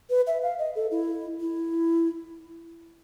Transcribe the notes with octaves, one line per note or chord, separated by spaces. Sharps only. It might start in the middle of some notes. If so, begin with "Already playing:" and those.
B4
E5
F5
D#5
A4
E4
E4